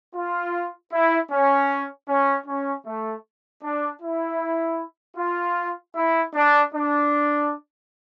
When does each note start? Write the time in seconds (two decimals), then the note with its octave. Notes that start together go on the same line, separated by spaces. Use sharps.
0.14 F4
0.91 E4
1.30 C#4
2.08 C#4
2.46 C#4
2.85 A3
3.63 D4
4.01 E4
5.17 F4
5.95 E4
6.34 D4
6.72 D4